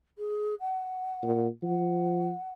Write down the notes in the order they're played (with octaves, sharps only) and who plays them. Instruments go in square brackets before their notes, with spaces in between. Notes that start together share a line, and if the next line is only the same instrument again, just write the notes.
[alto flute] G#4
F#5
[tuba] A#2
[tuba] F3 [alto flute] F#5